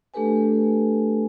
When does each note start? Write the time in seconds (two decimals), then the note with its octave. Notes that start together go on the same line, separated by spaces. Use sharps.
0.14 A3 D4 G4 A4 B4 G#5